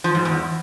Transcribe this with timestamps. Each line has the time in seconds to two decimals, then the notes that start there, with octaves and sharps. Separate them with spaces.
0.04 F3
0.15 G#2
0.25 E2